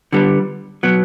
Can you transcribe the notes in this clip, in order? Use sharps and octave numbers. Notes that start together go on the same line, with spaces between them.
D3 G3 B3
B2 F#3 B3